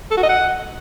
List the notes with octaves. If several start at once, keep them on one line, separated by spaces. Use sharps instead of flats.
A4
F#4
D#5
F#5